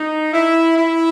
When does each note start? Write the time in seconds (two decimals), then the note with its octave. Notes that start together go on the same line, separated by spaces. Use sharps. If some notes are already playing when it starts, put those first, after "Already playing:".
Already playing: D#4
0.33 E4
0.77 E4